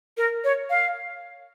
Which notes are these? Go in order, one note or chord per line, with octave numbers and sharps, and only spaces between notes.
A#4
C#5
F5